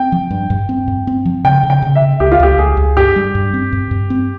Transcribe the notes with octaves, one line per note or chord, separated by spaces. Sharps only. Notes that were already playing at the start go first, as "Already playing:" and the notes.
Already playing: C4 G5
F3
G2
G2
C4
G2
C4
F3
C#3 G5
C#3
G5
C#3
E5
C#3
C#2 G4
F4
C#2 G4
C#2 G#4
C#2
G2 G4
G3
G2
C4
G2
G2
C4